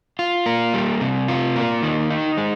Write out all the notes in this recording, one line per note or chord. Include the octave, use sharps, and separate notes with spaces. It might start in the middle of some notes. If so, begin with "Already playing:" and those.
F4
A#3
G3
C3
F4
A#3
D#3
D#4
G#3